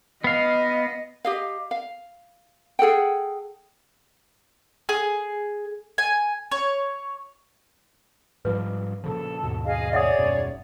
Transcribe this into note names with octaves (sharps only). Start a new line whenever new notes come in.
B3 D#5 F5
G4 D#5 F5
F5
G#4 A4 F#5 G5
G#4
G#5
C#5
G#2 F3 G3 B4
A#2 C#3 F3 A4
D#2 G#2 B2
G#4 D#5 F5
G#4 C#5 D5 E5 F#5 D#6
D#1 F#2 B2